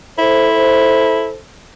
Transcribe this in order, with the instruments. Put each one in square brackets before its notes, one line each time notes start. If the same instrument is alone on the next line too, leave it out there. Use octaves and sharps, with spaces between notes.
[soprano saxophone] E4 [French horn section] A4 C5